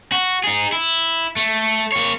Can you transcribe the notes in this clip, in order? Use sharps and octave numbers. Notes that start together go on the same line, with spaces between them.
F#4
D#4 G#4
E4
A3
A#3 C#5